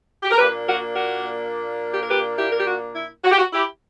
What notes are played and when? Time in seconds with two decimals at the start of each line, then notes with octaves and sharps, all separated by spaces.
0.23 G4
0.31 A#4
0.38 A#2 A#3 D4 G4 B4
0.67 F#4 A#4
0.95 F#4 A#4
1.94 G4
2.01 A#4
2.09 G4 B4
2.38 E4 G4
2.52 A#4
2.59 G4
2.67 F#4
2.95 E4
3.24 F#4
3.32 G4
3.38 F#4
3.53 E4 G4